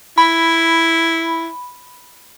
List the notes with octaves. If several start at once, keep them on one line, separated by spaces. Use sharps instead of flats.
E4 B5